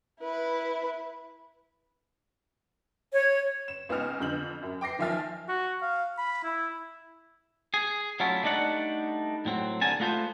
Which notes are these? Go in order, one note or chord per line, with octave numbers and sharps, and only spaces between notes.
E4 B4
C#5
E7
C#2 B3 D#4 G#5 F6 F7
F2 D3 G6 F#7
F#2
G5 D6 A#6 C7
D#3 F3 E5 G#5 F6 A6
F#4
F5
B5
E4
G#4
F#3 A3 C#4 E4 F4
G3 A3 D4 D#4 D5 F#5
A2 F#3 C4
C2 D3 A#4 G#5 A5
A3 B3 F4 A4 C5